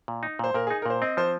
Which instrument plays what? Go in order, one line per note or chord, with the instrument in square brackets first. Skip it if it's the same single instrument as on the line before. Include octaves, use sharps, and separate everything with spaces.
[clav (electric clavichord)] A#2
D#4
[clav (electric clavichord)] A#2 [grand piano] C5
[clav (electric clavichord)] A#2 [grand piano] A#4
[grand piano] G#4
[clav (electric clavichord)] D#4
[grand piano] A#4
[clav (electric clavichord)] A#2 [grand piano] C5
[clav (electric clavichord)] C4 [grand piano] D#5
[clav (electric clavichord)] F3 [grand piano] C5